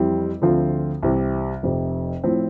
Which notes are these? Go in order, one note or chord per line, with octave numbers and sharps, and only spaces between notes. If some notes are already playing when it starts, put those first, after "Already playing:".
Already playing: F2 E3 G3 C4 E4
D2 D3 F3 C4 F4
C2 C3 E3
F1 F2 C3
A2 F3 C4 E4